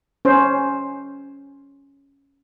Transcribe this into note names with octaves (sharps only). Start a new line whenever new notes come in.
C#4 C5